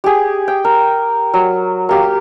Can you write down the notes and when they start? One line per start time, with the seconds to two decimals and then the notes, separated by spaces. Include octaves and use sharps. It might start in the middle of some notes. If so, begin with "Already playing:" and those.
0.04 G4 G#4
0.48 G5
0.65 A#4
1.34 F#3
1.89 A#3 G4 F5